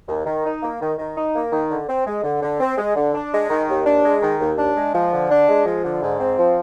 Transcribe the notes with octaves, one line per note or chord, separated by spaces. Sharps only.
D#2
D#3
D#4
A#3
D#3
D#3
D#4
A#3
D#3
D3
C4
G#3
D3
D3
C4
G#3
D3
D4
G#3
D#3
D#2
D4
G#3
D#3
D#2
D4
G#3
F3
D3
D4
G#3
F3
D3
G#2
C4
F3